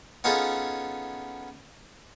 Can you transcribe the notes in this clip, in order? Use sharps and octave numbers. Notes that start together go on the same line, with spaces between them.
B3 C#4 D#4 F4 G#4 A4